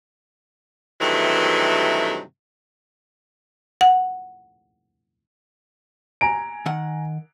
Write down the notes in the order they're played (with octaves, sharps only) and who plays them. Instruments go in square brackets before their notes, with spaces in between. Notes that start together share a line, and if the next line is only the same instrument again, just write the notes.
[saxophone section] G2 C3 D#3 E3 F#3 A3
[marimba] F#5
[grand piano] G#5 A#5 D7
[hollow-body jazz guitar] D#3 F#5